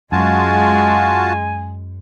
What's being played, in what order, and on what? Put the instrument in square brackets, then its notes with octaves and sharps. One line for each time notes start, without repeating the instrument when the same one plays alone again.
[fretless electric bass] F#2 [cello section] G#3 [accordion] F4 F#4 A5 [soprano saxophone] G#5